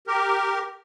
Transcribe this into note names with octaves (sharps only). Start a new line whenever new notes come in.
G4 A#4